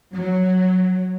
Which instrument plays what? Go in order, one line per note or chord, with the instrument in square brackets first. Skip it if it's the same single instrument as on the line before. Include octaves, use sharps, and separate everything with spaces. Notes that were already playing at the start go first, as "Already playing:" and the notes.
[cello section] F#3